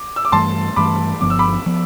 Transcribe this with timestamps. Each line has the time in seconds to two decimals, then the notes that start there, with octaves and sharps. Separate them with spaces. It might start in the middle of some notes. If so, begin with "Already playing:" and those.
Already playing: D6
0.16 E6
0.25 D6
0.32 G2 E3 A3 A5 C6
0.76 G2 E3 A3 B5 D6
1.21 G1 G2 F3 B3 D6
1.30 E6
1.39 B5 D6
1.66 F3 B3